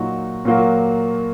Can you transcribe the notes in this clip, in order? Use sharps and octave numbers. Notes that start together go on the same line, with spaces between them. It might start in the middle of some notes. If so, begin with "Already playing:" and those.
Already playing: A#2 F#3 D#4 F#4
A#2 F#3 A#3 F#4